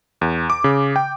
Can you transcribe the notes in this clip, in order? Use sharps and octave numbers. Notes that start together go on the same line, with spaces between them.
E2
D6
C#3
G5